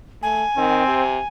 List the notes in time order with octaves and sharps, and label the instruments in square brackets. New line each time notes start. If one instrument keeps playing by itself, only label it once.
[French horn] A3 [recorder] G#5
[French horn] D#3 [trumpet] C4
[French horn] C3